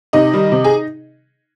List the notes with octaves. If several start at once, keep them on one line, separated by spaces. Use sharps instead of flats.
C3 D#4 D#5
D#3 G3
C3
G#4